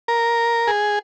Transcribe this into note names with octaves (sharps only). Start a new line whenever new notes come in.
A#4
G#4